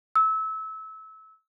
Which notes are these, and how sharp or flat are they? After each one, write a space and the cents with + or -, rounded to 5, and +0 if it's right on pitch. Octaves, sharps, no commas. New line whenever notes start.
E6 -25